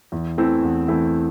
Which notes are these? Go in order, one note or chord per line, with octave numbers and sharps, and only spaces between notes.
E2
E3 A3 C4 E4
E2
E3 A3 C4 E4